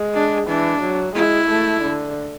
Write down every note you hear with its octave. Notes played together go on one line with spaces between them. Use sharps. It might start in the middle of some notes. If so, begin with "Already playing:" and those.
Already playing: G#3
D4
E3 D4
F#3
G#3 E4
A3
D3